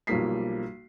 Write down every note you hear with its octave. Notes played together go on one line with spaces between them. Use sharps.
B1 F3 G3 A#3 B6 C7